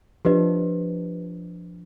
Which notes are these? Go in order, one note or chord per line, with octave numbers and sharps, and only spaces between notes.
F3 D4 G4 B4 D#5